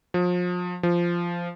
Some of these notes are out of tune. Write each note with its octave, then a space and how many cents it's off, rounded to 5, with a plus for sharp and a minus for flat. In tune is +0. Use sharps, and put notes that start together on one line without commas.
F3 +35
F3 -10